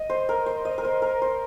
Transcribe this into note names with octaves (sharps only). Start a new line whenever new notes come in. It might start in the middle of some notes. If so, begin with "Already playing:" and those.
Already playing: D#5
C5
A#4
C5
D#5
A#4
C5
A#4
C5